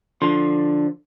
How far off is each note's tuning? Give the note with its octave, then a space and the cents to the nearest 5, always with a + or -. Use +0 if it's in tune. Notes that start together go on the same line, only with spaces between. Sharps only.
D3 +0 F3 +0 C6 +20